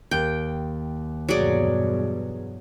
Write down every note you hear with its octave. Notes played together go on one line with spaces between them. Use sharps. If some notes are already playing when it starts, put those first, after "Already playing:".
D#2 G5
E2 G2 B2 F#3 G#4 D5